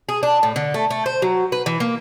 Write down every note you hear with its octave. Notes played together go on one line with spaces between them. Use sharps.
G#4
D4
A2
D3
A3
A3
C5
F#3
B4
E3
A#3